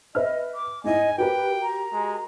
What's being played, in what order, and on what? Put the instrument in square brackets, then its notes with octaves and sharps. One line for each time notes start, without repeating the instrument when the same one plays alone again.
[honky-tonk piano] B4 E5 F6 [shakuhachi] D#5
[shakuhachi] D6
[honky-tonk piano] G#2 E4 [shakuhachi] D#5 [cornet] G#5
[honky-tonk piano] F#4 G4 A#4 [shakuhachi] B4 [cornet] G5
[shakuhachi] A#5
[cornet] G#3